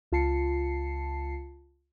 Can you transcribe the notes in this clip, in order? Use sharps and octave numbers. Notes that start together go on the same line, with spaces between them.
C#2 F4 A5 C7 C#7